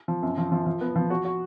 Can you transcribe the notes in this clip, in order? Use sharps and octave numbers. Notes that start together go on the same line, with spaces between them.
F3
F#2
F3
F3
F3
B3
F3
F#4
F#4